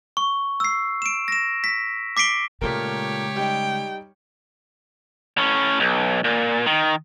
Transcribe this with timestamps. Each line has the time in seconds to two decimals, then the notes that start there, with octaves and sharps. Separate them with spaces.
0.17 C#6
0.60 E6 C7
1.02 D7 E7
1.28 A#6 E7
1.64 B6
2.17 D6 B6 C7 D7 G7
2.61 A#2 C#3 G#3 A3 G4 A#4 C#5
3.36 G3 D#4 G5
5.37 A2 C#4
5.80 B1
6.24 A#2
6.66 D#3